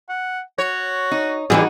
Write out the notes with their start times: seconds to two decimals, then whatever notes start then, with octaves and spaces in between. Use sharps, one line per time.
0.09 F#5
0.58 F#4 C#5
1.11 D#4
1.50 A#2 E3 G3 D#4 F#4 G#4